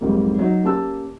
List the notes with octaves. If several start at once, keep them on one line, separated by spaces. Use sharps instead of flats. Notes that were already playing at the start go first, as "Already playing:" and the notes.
B1 F2 G#2 G3 A#3
F#3 D#4
A#3 C#4 G4 A5 E6